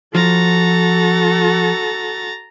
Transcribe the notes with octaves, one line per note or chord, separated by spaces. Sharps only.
F3 F#4 A4 A#5 A6